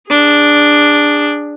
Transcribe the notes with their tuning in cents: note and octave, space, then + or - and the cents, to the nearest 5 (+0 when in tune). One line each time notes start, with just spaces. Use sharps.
D4 +0 G#4 -25